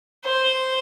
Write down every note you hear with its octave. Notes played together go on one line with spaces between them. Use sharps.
C5